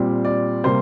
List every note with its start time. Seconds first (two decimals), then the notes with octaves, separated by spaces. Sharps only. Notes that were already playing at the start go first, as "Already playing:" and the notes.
Already playing: A#2 G3 C4
0.25 D5
0.64 C3 G3 A#3 C5